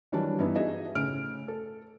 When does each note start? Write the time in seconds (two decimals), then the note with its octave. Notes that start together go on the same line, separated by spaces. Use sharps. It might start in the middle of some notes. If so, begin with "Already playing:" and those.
0.12 D#3 E3 F#3 G3 D4
0.39 G2 E3 B3 D#4 E4
0.55 D#4 F#4 G#4 D#5 E5
0.95 A2 C#3 F6 D7
1.48 A4